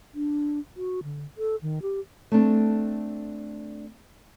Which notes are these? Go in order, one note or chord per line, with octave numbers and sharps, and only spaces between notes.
D4
F#4
D3
A4
D#3
G4
A3 C4 D4